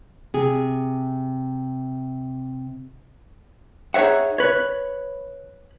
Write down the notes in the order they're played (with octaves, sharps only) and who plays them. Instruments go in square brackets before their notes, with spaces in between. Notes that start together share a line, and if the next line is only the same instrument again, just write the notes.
[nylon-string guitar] C3 G#4
[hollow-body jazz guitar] D#4 G#4 C#5 E5 F#5
B4 C#5